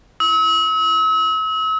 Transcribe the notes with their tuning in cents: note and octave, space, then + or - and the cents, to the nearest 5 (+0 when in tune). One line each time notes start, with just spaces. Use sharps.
E6 -40